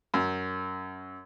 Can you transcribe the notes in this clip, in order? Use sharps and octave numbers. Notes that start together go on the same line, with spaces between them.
F#2